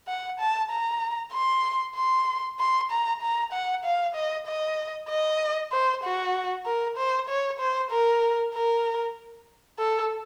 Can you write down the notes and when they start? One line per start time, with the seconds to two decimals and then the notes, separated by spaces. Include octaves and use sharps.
0.08 F#5
0.40 A5
0.71 A#5
1.34 C6
1.96 C6
2.60 C6
2.91 A#5
3.22 A#5
3.53 F#5
3.85 F5
4.15 D#5
4.47 D#5
5.09 D#5
5.72 C5
6.04 F#4
6.66 A#4
6.98 C5
7.29 C#5
7.60 C5
7.91 A#4
8.55 A#4
9.80 A4